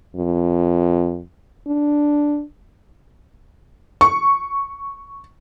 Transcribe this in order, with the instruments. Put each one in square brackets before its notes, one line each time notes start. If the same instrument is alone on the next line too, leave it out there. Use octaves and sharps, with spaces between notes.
[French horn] F2
D4
[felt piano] C#6